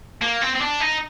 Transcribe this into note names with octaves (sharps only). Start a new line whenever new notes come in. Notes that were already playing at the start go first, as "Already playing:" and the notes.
A#3
C4
C4
D4
D#4